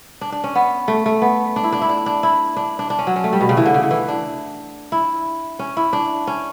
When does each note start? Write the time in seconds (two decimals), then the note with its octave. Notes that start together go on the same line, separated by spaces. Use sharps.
0.21 D4
0.32 D4
0.44 C#4
0.55 B3
0.88 A3
1.06 A3
1.22 B3
1.56 D4
1.64 E4
1.72 D4
1.81 E4
1.89 D4
2.06 D4
2.23 E4
2.56 D4
2.79 D4
2.90 D4
2.99 C#4
3.07 F#3
3.16 C#4
3.24 A3
3.33 G3
3.41 B2
3.49 C#3
3.57 E3
3.66 D3
3.74 C#3
3.83 D3
3.91 E3
4.08 D4
4.92 E4
5.59 C#4
5.77 E4
5.93 D4
6.27 C#4